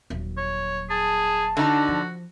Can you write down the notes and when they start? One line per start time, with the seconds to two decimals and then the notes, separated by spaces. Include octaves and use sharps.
0.10 D#1 F#3
0.37 C#5
0.90 G#4 A5
1.57 D3 D#4 F#4
1.88 F3